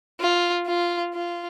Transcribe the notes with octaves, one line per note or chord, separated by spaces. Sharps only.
F4
F4
F4